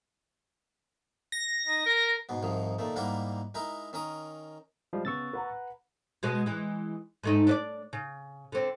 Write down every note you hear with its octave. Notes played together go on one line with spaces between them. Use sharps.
A#6
D#4
A#4
G#2 B2 B3
C2 G#2 D#3 F3
A#2 D#3 A3
G#2 G3 A#3 E4 A#4 F#5
G#3 D#4 E4 A#4
D#3 C#4 A#4 D#6
F3 G3 G#3
C#3 B3 C#6 E6 A6
B4 F#5 A#5
B2 G#3 B3
E3 G#3
G#2 A3 D#4
D4 B4 D5
C#3
D3 C4